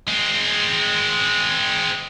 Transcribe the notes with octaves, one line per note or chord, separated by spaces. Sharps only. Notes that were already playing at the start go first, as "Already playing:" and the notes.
G#3 C4